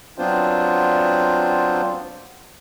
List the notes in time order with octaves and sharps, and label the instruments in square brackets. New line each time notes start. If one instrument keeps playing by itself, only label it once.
[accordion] F#3 B3 C4 D4 F4 C5